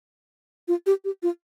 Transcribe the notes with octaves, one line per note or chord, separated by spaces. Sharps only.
F4
G4
G4
F4